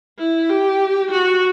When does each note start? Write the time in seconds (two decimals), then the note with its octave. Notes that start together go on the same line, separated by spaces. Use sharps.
0.19 E4
0.49 G4
1.11 F#4